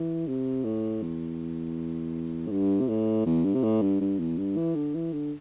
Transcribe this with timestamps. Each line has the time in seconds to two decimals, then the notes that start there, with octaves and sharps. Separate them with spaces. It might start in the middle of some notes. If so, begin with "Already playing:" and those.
Already playing: E3
0.28 C3
0.65 A2
1.02 E2
2.47 A2
2.51 G2
2.81 C3
2.89 A2
3.26 E2
3.45 G2
3.54 C3
3.63 A2
3.82 G2
4.01 G2
4.19 E2
4.38 G2
4.57 E3
4.75 D3
4.94 E3
5.13 D3